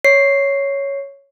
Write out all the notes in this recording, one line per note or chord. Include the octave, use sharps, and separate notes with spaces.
C#5 C7